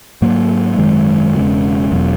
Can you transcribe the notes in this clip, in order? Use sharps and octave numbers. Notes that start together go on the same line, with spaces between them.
G#2 F#3 A#3
G#1 F#2 D#3 G#3
E1 E2 C#3 G#3
E1 E2 B2 F#3